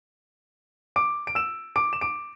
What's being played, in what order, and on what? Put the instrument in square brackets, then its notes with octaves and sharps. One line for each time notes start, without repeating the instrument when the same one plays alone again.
[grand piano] D6 D7
D7
E6 E7
D6 D7
E7
D6 D7